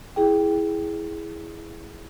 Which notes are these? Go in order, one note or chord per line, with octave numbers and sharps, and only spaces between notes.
E4 G#4 G5